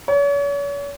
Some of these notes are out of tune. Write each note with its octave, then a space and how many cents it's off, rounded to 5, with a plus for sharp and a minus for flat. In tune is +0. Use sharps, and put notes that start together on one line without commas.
C#5 +40